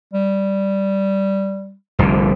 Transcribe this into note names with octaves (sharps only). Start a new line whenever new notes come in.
G3
F1 C2 D3